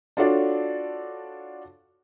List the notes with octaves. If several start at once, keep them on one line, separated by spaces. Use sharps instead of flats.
D4 F4 F#4 A4 C#5 D5